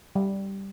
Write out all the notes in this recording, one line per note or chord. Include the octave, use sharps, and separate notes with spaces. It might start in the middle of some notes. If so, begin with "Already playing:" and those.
G3